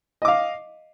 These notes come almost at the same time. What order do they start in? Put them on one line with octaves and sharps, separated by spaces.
D#5 D6 F5